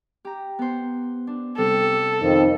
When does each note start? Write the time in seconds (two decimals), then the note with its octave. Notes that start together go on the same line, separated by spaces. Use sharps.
0.25 G4 A#5
0.59 B3 C5
1.27 D4
1.58 C3 G3 A4
2.22 F2 D#3